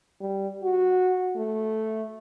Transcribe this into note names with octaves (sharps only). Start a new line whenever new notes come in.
G3
F#4
A3